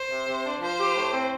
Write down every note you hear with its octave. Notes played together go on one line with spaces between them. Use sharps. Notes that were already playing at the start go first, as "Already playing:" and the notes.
Already playing: C5
C3
C3
D4
F3 C5
G4
A2
C4